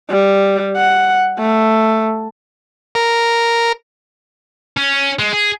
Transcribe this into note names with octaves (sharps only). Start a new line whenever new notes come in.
G3
F#5
A3
A#4
C#4
G#3
G#4